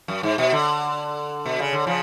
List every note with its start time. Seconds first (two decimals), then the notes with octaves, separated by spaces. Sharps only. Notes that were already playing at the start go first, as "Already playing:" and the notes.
0.08 F#2
0.23 G#2
0.38 B2
0.53 D3
1.46 B2
1.60 C#3
1.73 D3
1.87 C#3 F3